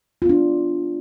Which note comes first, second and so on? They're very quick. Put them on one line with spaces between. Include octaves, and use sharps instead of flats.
F4 B3 D4